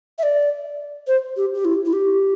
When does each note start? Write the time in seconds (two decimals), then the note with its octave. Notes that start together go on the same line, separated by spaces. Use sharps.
0.18 E5
0.23 D5
1.07 C5
1.37 G4
1.54 G4
1.65 E4
1.86 E4
1.93 G4